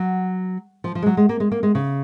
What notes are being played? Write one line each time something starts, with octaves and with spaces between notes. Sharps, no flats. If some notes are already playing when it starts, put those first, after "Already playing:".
Already playing: F#3
F3
F3
G#3
F#3
G#3
A#3
G#3
A#3
G#3
C#3